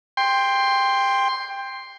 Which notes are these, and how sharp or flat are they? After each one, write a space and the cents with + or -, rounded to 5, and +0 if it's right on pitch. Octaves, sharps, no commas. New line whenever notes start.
G5 +15 C6 +0